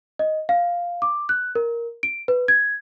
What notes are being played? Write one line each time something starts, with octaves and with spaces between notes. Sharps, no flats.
D#5
F5
D6
F#6
A#4
D7
B4
G#6